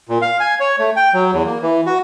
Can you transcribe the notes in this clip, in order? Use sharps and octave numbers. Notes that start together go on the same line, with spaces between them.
A#2
F5
G#5
C#5
A3
G5
F#3
E2
A#3
E3
F#4